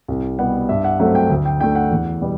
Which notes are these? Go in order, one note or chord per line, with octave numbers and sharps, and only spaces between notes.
C2
B2 G3 B3 F#5
G2 E5
F#5
F#3 A3 C4 F#5
G5
D2
G5
D3 A3 G5
F#5
E2
B2 G3 B3